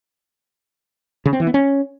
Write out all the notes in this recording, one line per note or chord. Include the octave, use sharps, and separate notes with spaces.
C#3
C4
E3
B3
C#4